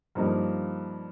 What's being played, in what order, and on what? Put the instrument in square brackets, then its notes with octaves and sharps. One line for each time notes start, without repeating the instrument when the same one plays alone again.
[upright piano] G2 F3 A#3 D#4